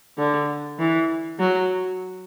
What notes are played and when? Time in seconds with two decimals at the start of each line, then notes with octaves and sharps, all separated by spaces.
0.18 D3
0.79 E3
1.40 F#3